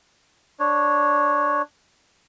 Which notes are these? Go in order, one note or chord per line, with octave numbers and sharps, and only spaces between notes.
D4 C#5